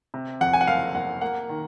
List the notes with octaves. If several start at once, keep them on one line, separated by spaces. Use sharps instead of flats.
C3
F2 F#5
G#5
F#5
F#1 F5
F#1 F#5
A#3 F#5
D#3